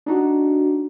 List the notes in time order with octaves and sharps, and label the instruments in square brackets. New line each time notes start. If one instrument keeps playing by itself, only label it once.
[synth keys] D4 D#4 F#4